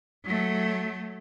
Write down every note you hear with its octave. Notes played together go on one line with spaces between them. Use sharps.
F#3 A3